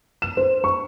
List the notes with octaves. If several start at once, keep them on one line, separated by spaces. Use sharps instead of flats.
E7
C5
C#6